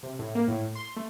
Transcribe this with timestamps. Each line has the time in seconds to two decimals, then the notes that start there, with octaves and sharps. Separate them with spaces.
0.03 C3
0.19 A2
0.35 A#3
0.48 A2
0.75 C6
0.96 A3